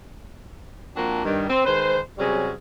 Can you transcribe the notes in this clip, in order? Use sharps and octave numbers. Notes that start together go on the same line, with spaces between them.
F3 A#3 C4 D4 F#4
G2 D#3 G3
C4
D#3 G#3 B4 C5
C3 F#3 G3 C#4 F#4 G#4